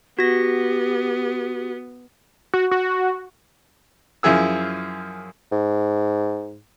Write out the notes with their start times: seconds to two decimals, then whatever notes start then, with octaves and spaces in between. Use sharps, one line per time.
0.19 B3 F#4 G4 A#6
2.54 F#4
2.71 F#4
4.23 F#2 F3 E4 G#4 E6
5.52 G#2